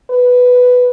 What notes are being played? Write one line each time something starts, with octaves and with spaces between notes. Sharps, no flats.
B4